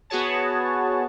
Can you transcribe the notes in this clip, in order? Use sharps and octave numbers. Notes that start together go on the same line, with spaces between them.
B3 F#4 G#4 C#5 A5